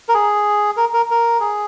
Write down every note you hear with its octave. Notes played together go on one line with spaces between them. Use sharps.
A#4
G#4
A#4
A#4
A#4
G#4